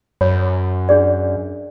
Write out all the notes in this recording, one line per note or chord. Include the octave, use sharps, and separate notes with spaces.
F#2 C#5 B5
D4 G#4 D5